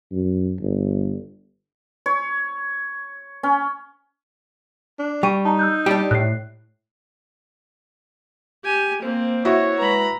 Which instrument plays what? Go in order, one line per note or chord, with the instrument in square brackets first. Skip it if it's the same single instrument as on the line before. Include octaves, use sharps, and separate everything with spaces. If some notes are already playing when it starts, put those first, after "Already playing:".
[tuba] F#2
G1
[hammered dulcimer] C#5
C#4
[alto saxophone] D4
[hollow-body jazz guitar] G3 [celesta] G5 C#6 D#7
[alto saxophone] D#4 [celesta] A5 A#5
[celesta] E6 F#6 G6
[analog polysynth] G3 [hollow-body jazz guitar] D4 G4
[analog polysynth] A2 [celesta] F#6 C7
[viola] G4 G#5
[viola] A#3 C4 [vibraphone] C5
[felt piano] E4 F#4 [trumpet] C#5
[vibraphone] G#3 B4 [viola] A#5 B5